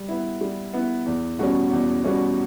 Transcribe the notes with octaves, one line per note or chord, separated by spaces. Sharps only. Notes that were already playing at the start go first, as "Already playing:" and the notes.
Already playing: G3
B3 E4
G3
B3 E4
E2
B2 G3 C#4
E2
B2 G3 C#4